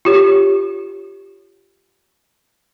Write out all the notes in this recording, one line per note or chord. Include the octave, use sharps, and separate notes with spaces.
F4 G4 C#5